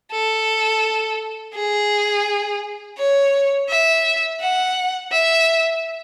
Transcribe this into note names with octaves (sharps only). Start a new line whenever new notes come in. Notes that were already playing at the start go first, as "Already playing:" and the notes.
A4
G#4
C#5
E5
F#5
E5